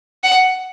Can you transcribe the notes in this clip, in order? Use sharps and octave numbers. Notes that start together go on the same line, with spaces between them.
F#5